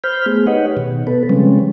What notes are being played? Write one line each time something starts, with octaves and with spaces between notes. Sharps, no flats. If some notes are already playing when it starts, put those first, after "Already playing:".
C5 B5 F6 G6
A3 B3 G#4
D#4 G4 B4 C#5 D#5 F#5
B2 D#3
B3 A4 B4
C#3 F3 G3 G#3 C4 C#4